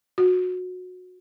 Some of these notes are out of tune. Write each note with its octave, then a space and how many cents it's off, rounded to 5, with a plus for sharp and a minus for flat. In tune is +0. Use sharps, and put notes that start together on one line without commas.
F#4 -25